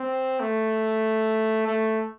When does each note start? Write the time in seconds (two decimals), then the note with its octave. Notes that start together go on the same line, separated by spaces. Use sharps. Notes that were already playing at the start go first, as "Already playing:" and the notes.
Already playing: C4
0.40 A3
1.67 A3